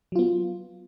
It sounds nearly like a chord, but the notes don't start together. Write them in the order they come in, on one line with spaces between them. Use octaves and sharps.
F#3 F4 B3